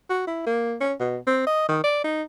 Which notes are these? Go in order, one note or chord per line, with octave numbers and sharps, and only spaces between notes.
F#4
E4
A#3
C#4
B2
C4
D#5
D#3
D5
D#4